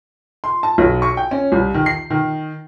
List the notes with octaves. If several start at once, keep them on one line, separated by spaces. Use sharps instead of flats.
C6
A5
B1
C#6
G5
C#4
C2
D#3
C7
D#3